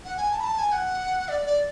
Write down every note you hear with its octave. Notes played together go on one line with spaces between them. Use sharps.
F#5
G#5
A5
B5
A5
G#5
F#5
D5
D5